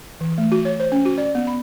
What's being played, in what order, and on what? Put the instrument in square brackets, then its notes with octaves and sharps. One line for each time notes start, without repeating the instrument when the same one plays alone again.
[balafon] E3
A3
F#4
C#5
C5
C#4
F#4
D5
B3
B5